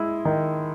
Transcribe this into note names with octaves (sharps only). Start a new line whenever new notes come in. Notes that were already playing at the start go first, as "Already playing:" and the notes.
Already playing: G#3 E4
D#3